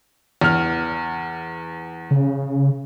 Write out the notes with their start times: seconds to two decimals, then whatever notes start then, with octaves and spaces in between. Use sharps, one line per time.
0.41 E2 F6
2.11 C#3